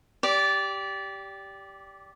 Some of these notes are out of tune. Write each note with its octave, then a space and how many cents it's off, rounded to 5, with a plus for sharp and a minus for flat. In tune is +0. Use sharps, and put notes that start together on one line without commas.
G4 +0 D5 -20